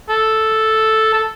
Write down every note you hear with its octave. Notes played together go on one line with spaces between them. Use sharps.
A4
A4